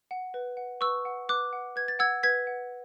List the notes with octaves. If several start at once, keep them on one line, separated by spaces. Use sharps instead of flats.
F#5
B4
F#5
B4 C#6 E6
F#5
B4 D6 F#6
F#5
B4 G#6
A6
F#5 E6 G#6
B4 G#6 B6
F#5